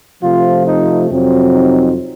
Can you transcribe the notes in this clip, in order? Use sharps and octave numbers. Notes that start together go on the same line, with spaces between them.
C3 F3 A3 C4 F4
D#4
F2 C3 F#3 C4
D#4